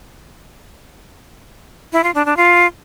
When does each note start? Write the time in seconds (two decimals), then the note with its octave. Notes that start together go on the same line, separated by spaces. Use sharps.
1.93 E4
2.04 F4
2.15 D4
2.26 D4
2.37 F4